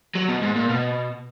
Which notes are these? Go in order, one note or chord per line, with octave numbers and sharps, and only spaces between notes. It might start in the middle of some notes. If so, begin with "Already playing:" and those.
F#3
B2
G#2
A#2
B2